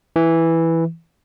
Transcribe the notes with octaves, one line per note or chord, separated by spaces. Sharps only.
E3